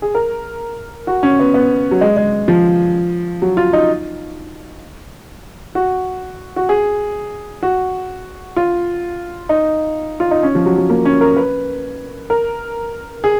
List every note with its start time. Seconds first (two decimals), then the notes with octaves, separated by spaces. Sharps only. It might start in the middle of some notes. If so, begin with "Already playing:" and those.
0.02 G#4
0.15 A#4
1.07 F#4
1.23 C#4
1.39 B3
1.54 B3
1.91 F#3
2.01 G#3
2.17 G#3
2.48 F3
3.42 F#3
3.57 F4
3.73 D#4
5.75 F#4
6.56 F#4
6.69 G#4
7.63 F#4
8.56 F4
9.49 D#4
10.20 F4
10.31 D#4
10.43 C#4
10.55 F3
10.66 F#3
10.78 F#3
10.90 A#3
11.05 C#4
11.21 A#4
11.37 B4
12.30 A#4
13.24 G#4